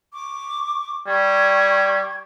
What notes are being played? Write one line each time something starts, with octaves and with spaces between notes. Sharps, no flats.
C#6 D6
G3 G5 C#6 G#6